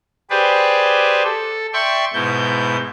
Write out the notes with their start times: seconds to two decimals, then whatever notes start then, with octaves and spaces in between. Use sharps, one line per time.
0.30 G4 G#4 B4 C5 D5
1.24 A4
1.73 D5 E5 G5 C6 C#6 E6
2.13 G#2 B2 E4 G6